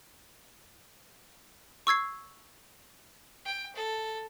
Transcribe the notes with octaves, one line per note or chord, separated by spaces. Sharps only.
C#6 E6 G#6 C7
G5
A4